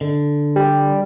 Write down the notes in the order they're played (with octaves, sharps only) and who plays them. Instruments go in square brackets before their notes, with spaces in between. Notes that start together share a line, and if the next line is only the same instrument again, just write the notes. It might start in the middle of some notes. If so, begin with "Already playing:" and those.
[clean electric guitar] D3
[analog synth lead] G3